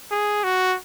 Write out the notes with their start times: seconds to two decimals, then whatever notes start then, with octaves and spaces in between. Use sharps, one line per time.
0.11 G#4
0.44 F#4